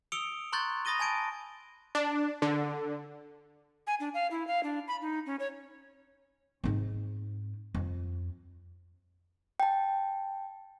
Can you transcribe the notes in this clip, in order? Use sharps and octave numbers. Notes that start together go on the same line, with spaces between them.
D#6 E6 C#7 D7 F7 G7
A#5 C6 C#6 F#6 G6 A6
B5 D#6 A6 A#6 D#7 G7
G#5 A5 G#6 D7 D#7
D4
D3
G#5
D4
F5
E4
F5
D4
B5
D#4
C#4
C#5
G#2 C4
F2
G5 A5